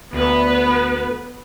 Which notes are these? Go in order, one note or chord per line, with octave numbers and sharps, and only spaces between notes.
D2 B3 B4